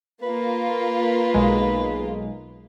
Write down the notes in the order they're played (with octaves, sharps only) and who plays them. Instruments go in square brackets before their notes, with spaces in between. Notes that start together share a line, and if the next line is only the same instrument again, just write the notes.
[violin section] A#3 F4 [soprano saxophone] B4
[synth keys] B1 G#3